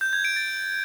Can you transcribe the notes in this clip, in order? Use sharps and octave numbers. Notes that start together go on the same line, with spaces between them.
G6
G#6
D7
A6